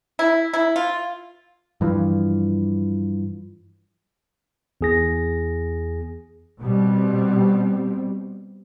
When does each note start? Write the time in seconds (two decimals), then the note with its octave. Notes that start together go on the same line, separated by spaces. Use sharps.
0.19 E4
0.53 E4
0.76 F4
1.81 G2 E3 F3
4.81 E2 G#4 A#6
6.61 B2 G3 C4